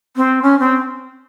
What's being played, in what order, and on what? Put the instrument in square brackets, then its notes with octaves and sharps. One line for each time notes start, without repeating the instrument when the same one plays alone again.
[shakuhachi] C4
C#4
C4